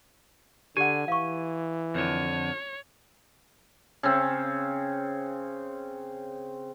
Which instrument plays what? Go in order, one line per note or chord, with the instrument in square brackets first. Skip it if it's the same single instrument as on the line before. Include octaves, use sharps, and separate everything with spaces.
[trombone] D3 [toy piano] G4 F#5 [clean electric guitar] G#5
[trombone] E3 [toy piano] F5 C#6
[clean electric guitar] F2 D3 [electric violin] C#5
[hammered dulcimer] C#3 C4